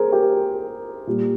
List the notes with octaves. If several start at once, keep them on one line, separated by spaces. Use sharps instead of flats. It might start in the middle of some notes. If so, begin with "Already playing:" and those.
Already playing: G#4 A#4 C5
G4 A#4
A#2 G3